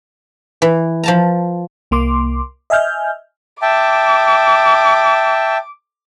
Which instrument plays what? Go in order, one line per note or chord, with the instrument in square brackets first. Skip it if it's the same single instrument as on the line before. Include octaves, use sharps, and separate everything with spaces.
[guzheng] E3
F3 A5 A#5
[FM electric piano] C2 A#3 C6 D6
D#5 E5 G#5 F6 G6
[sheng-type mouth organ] E5 G5 A5 [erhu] D6